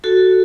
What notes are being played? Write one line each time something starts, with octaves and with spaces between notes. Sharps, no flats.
F#4 A4